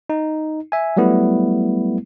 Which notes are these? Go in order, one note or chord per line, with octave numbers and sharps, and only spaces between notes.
D#4
E5 G#5
F#3 G3 A3 B3 E4